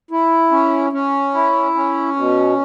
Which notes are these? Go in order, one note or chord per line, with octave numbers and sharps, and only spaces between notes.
E4
C#4
C#4
E4
C#4
B2